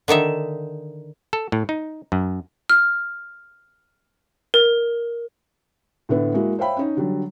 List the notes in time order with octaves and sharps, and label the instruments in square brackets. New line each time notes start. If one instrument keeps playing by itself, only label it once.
[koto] D3 D#3 D#4 E5
[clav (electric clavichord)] A4
A2
D#4
F#2
[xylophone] F6
A#4
[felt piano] A2 D3 B3 E4
G#3 A#3 E4 F#4
C5 C#5 E5 F5 G5 B5
C#4 D#4
D3 F#3 G3